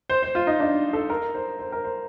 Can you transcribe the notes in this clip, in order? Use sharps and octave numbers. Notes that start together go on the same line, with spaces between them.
C5
C5
F4
D#4
D4
A4
A#4
C5
C5
A#4
C5